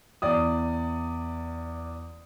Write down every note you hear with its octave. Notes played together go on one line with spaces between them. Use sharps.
E2 D5 D#6